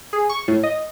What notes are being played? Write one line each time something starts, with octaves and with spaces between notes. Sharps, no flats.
G#4
C#6
A2
D#5